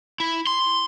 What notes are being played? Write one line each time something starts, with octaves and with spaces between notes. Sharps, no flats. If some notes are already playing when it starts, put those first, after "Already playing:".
E4
C6